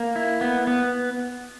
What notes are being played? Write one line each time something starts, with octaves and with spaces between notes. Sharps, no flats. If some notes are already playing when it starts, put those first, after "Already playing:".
Already playing: A#3
E4
B3
B3